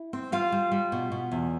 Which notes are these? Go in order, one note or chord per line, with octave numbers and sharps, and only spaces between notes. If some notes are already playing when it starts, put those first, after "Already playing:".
Already playing: E4
C4
G3 F4 F5
G3
G3
B2
B2
E2